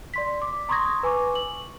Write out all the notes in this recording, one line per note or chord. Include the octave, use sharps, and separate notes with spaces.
D5 C6 B6
D6
A#5 C6 C#6 D#6 G#6 A#6
B4 G#5 C#6 D6
F#7